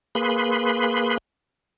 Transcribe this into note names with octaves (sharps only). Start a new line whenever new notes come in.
A#3 G#4 B4 B5 C6